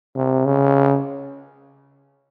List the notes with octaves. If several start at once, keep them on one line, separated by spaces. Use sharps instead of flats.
C3
C#3